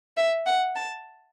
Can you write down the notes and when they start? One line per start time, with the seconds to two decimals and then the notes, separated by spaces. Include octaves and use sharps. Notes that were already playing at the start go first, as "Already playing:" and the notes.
0.17 E5
0.46 F#5
0.76 A5